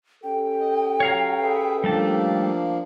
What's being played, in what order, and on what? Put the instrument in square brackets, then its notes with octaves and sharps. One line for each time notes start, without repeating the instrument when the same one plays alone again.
[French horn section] C#4 G4 A4 [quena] G5
[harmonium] D#5
[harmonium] F#3 [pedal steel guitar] C#5 F5 A#5
[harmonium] G#4 B4 E5
[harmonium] F3 A#3 D4 [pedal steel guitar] G3 A3 A5